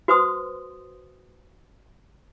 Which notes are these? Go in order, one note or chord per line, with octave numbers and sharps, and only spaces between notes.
F#4 B4 C5 C6 D#6